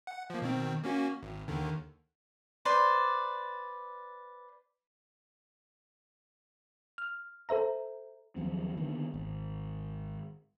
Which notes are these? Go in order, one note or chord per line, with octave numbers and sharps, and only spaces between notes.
F#5
F3 A#3
B2 D#3 C4
A#3 C#4 F#4
G#1
D#2 D3 D#3
B4 C5 D5
F6
A4 C5 E5 A#5
D#2 F3 F#3 C4
D3 D#3 A#3 B3
G#1